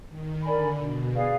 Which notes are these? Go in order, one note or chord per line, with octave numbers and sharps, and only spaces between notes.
D#3
D3 A#4 D5 G#5 B5
B2
G#4 B4 D5 F5